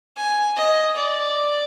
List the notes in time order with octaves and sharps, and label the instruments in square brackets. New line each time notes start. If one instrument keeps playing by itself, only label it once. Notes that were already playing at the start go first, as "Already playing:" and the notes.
[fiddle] G#5
D#5
D5